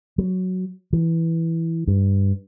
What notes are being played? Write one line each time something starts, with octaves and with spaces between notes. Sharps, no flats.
F#3
E3
G2